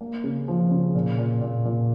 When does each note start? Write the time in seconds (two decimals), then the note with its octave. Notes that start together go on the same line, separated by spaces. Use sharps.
0.01 A#3
0.24 C#3
0.48 F3
0.71 C#3
0.95 A#2
1.18 A#2
1.41 A#2
1.65 A#2